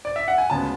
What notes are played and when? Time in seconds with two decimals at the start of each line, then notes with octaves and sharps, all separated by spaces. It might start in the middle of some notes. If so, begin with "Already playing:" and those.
0.05 D5
0.16 E5
0.28 F#5
0.38 G#5
0.50 D2 C#3 G#3 B3 A5